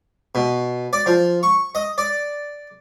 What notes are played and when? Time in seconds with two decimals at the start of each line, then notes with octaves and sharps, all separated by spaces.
0.35 B2
0.93 D5
1.06 F3
1.43 C#6
1.75 D#5
1.98 D5